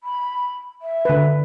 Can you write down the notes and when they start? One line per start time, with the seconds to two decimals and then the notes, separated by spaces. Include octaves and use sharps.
0.04 B5
0.82 E5
1.05 D3 B4